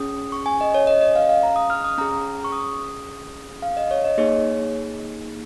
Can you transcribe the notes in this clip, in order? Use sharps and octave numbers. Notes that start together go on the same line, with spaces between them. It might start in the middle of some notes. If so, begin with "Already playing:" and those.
Already playing: C#4 G#4 D#6
C#6
G#5
D#5
C#5
D#5
D#5
F5
F5
A#5
D#6
F6
D#6
C#4 G#4 A#5
C#6
D#6
F5
D#5
C#5
D#5
A#3 D#4 G#4 C#5